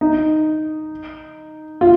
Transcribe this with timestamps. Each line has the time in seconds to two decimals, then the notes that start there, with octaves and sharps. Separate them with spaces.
0.01 D#4
1.81 F4